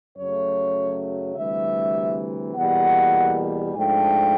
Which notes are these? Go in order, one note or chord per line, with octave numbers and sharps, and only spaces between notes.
F#2 C#3 F#3 A3 C#5
D2 C3 E3 G3 E5
E2 B2 G3 A#3 F#5
G#2 F3 A3 D4 G5